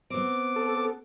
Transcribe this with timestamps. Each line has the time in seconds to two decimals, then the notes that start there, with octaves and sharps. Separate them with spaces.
0.10 B3 C4 D6
0.56 A4